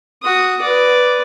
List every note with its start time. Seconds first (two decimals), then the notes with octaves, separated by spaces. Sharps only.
0.23 F#4 D#6
0.61 B4 D5